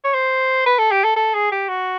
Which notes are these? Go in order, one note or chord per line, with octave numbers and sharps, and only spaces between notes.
C#5
C5
B4
A4
G4
A4
A4
G#4
G4
F#4